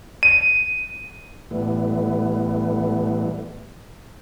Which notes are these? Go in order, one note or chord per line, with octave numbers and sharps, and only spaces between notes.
D#7
A2 E3 G3 A3 B3